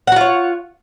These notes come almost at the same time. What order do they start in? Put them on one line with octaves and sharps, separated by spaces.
F#5 F#4 F4 C#5